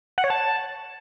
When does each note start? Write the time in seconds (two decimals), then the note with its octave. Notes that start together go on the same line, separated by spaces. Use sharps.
0.18 F#5
0.24 C#5
0.30 A5